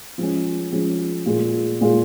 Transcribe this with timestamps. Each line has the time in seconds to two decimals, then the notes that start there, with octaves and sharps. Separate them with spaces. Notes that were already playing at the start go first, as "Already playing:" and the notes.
0.18 F3 G#3 C#4
0.72 F3 G#3 C#4
1.26 A#2 G#3 F4 G#4
1.81 A#2 G#3 F4 G#4